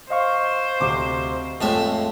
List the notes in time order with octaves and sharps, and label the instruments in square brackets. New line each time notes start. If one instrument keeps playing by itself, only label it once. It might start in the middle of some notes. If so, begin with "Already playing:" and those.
[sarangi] C5 [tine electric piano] D#5 F5 C#6
[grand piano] D2 C3 D6
[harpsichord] F2 A2 E5 [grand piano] G#3